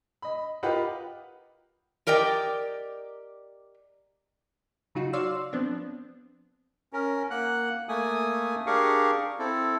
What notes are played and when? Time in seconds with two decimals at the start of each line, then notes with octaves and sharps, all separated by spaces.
0.22 D#5 B5
0.63 F4 G4 A#4 B4 D#5 F#5
2.07 G4 A#4 D5 D#5 G5
4.95 C#3 F#3 D#4 F4 F#4
5.13 F#4 C#5 D5 F5 C6 E6
5.53 F3 B3 C4 D4
6.93 C#4 A#4
7.30 A#3 F#5 F#6
7.89 A3 A#3 G#5 D#6
8.66 D4 G4 G#4 A#4 F5 C#6
9.39 C4 E4 A4